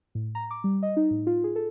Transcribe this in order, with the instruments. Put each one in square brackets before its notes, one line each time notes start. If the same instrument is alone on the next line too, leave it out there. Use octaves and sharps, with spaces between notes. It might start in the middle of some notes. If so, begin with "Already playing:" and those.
[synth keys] A2
A#5
D6
G3
D#5
D#4
A2
F4
G#4
A4